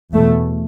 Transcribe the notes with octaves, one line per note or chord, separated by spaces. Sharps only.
E2 B2 A3